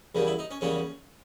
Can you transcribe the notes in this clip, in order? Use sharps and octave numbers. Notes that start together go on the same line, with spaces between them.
E2 C#3 G3 A#3
E4
D#4
C#4
E2 C#3 G3 A#3 C#4